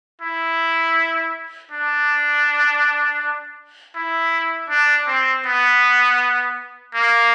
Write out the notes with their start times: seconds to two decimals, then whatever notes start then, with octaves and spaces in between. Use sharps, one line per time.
0.22 E4
1.72 D4
3.96 E4
4.70 D4
5.07 C4
5.46 B3
6.95 A#3